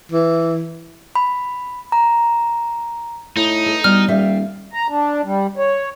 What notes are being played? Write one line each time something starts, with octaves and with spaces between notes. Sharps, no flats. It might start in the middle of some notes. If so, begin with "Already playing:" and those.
E3
B5
A#5
A2 D#4
A4
B2 G3 F6
D#1 G3 E5 F5
A#5
D4
G3
C#5